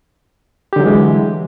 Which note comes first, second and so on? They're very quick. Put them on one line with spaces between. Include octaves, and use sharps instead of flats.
G4 D3 F#3 E3 G#3